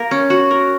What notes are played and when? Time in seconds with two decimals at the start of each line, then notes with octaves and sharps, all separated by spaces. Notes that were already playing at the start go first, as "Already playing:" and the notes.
Already playing: A#3 A#4
0.11 C#4
0.30 F#4
0.51 A#4